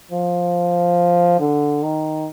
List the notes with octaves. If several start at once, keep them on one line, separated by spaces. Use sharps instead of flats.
F3
D3
D#3